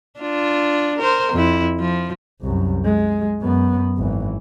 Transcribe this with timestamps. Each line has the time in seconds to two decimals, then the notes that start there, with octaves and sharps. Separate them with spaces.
0.20 D4 F4
0.98 A#4 C5
1.33 F2 E4
1.80 F3
2.41 C2 F#2
2.85 G#3
3.41 F#2 B3
3.97 G#1 E3